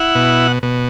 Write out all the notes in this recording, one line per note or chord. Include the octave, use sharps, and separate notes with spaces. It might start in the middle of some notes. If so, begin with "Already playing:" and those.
Already playing: E4 F#5
B2
B2